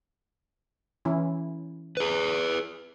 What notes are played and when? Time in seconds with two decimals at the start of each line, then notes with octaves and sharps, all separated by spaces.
1.05 E3 C#4 E4
1.97 G#4 B4